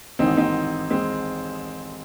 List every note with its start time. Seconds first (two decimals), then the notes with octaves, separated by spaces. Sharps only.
0.19 A1 G#2 D#3 C4 D#4
0.37 C4 D#4
0.90 G#3 C4